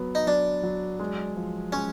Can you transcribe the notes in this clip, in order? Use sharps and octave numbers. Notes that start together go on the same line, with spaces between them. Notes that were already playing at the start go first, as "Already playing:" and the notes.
Already playing: F#3 B3
D#4
F#3 D4
F#3
G#3
F3
G#3 C#4